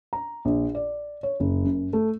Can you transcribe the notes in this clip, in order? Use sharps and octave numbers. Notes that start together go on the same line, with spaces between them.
A#5
A#1
D5
C#5
F#1
F#2
A3